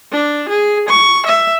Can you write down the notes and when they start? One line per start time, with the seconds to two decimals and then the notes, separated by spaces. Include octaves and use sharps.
0.12 D4
0.49 G#4
0.89 C#6
1.26 E5